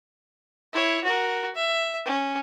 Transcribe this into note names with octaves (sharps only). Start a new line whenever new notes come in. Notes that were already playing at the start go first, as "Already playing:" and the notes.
E4 C#5
F#4 A#4
E5
C#4